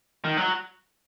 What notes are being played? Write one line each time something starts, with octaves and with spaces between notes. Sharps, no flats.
D#3
F#3